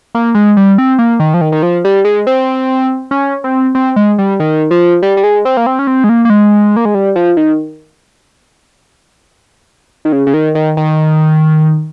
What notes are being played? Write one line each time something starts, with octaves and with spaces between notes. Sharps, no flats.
A#3
G#3
G3
C4
A#3
D#3
F3
D#3
D#3
F3
G3
G#3
C4
C#4
C4
C4
G#3
G3
D#3
F3
G3
G3
G#3
C4
A#3
C4
C#4
C4
G#3
A#3
A#3
G#3
A#3
G#3
G3
F3
D#3
D#3
C#3
C#3
D#3
D#3
D#3